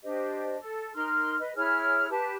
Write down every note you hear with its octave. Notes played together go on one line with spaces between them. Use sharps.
D4 G4 C5 D#5
A4
D#4 A#4 C6 F6
B4 D#5
E4 G#4 C#5 F6
G4 B4 A5